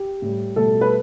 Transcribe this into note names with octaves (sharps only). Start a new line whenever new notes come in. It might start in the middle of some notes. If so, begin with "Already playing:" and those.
Already playing: G4
A2 G3
B2 G3 A3 A4
B4